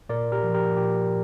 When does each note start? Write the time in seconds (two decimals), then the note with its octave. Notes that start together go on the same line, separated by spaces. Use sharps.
0.09 A#2 A#4 D5
0.32 G4 A#4
0.43 F3
0.54 G4 A#4
0.76 A#2 G4